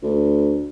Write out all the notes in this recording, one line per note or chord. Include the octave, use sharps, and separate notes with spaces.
D2